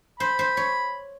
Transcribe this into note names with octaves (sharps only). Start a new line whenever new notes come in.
C5 B5
C5
C#5